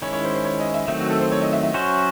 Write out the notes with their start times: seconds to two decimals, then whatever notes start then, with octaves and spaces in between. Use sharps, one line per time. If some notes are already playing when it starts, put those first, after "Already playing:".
0.02 D#3 G#3 C#4 E4 C#5
0.13 C#5
0.24 C5
0.34 C5
0.45 C#5
0.60 D#5
0.74 E5
0.88 D#3 F#3 A3 C4 E5
0.99 F#4
1.10 A4
1.20 C5
1.32 C#5
1.42 D#5
1.53 E5
1.63 E5
1.74 F#3 C#4 F#4 C5